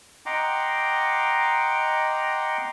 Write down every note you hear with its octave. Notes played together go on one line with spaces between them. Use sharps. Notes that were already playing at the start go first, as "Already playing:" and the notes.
D#5 F#5 G5 A#5 C6 D6